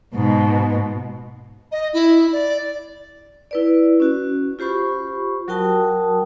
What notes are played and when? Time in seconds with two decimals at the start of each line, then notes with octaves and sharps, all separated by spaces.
0.14 G#2 B2
1.71 D#5
1.93 E4
2.32 D5
3.51 E4 B4 D5
4.00 C#4 F#4
4.59 F4 G4 C5 B5 C#6
5.48 F#3 F#4 A#4 G5 A5 D#6